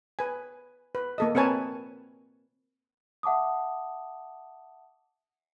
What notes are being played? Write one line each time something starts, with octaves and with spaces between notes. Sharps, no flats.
B4 G#5
B4
A#3 A4 D#5
C4 A#4 B4 C#5 G#5 A5
E5 F#5 A5 D6 D#6